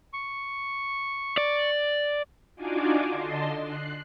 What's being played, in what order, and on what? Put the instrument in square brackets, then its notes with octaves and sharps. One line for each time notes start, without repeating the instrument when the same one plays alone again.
[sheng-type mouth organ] C#6
[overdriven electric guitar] D5
[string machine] D4 D#4 F4 F#4 G#5 D6
D3 D#5 A5 C6 C7
F#6 C7